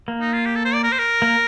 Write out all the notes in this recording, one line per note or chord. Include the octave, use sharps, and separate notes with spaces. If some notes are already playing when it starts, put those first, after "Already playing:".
A#3
D#4
F4
G4
A4
C5
D5
A#4
C5
A#4
A#3